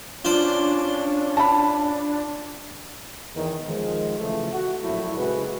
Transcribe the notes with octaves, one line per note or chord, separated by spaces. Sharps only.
C#4 D4 F4 C5 D5
A5 B5
E2 D#3
D#3 F3 G#3
C#3 E3 F3 A3
F#4
A#1 A2 F#3 A3 E4
C#3 G#3 C4 E4 F#4 B4